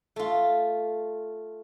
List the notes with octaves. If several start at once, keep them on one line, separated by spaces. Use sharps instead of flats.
A3 F4